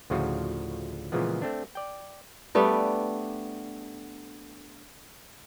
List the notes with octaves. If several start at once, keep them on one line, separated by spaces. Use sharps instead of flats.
D2 A2 C#3 F3 F4 F#4
A#2 C#3 E3 F3 G#3 B3
A3 C4 D4
D5 G5
G3 A3 B3 D4